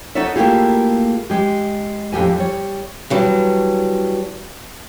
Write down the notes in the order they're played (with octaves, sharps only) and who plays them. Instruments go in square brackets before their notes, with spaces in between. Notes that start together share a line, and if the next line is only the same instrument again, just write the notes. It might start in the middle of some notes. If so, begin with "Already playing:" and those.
[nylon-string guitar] B3 D#4 A4 C#5 D5 E5
A3 A#3 E4 F4 G4 G#4
G#3 G4
F2 A2 G4 G#5
G3 C#5
[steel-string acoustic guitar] E3 F#3 G3 D4